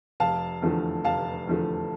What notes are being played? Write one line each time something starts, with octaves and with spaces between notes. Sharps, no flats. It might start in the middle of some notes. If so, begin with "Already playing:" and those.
F1 F5 A5
E2 D3 F3 A3
F1 F5 A5
E2 D3 F3 A3